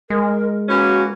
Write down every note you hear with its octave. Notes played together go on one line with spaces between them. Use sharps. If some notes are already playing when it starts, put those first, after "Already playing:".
G#3 A#4
E3 A#3 C#4 F#4